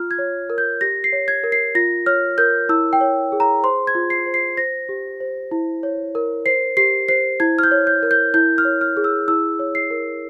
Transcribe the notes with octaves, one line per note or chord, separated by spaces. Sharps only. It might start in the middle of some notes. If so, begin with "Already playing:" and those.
Already playing: F4 F6
G#6
C#5
A#4
G6
G4 A#6
C7
C#5
G#6
A#4
C7
F4 A#6
C#5 F6
A#4 G6
E4 E6
G5
C#5
G#4
A#5
C5 C6
G#6
F4
C7
C5
C7
C5 A#6
G4
C5
E4
C#5
A#4
C5 C7
G4 C7
C5 C7
E4 G#6
F6
G6
C#5
G6
A#4
G6
E4 G6
F6
C#5
F6
G#4
E6
E4 E6
C#5
C7
A#4